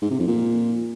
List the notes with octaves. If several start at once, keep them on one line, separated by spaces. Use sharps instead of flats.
G#2
C3
F2
A#2